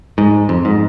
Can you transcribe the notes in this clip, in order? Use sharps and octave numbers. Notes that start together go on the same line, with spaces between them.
G#2
F2
G#2